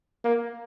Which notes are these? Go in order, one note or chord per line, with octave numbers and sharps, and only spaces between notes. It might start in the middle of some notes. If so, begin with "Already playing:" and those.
A#3